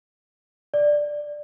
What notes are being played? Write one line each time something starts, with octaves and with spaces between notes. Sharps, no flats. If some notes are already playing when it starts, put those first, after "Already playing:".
D5